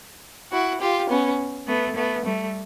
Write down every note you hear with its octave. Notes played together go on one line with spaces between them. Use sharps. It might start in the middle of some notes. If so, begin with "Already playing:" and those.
E4 F#4
F4 G4
B3 C#4
A3 B3
A3 B3
G3 A3